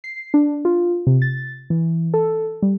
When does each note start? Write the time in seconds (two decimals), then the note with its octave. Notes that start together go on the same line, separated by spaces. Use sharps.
0.04 C7
0.34 D4
0.65 F4
1.07 C3
1.22 A6
1.70 E3
2.14 A4
2.62 G3